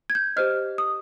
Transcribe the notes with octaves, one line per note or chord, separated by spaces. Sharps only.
G#6
G6
G4 C5 D#5 F6
D#6